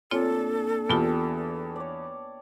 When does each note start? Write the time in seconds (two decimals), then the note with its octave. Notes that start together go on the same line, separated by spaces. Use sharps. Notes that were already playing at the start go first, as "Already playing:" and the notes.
0.11 A#2 C4 D4 F4 A4 C#5
0.89 E2 B3 F4 G4 G5 A5
1.76 C#5 D5